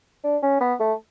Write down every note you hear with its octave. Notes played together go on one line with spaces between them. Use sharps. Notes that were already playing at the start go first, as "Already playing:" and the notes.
D4
C#4
B3
A3